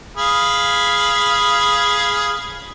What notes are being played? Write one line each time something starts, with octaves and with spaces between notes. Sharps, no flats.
G#4 F5 B5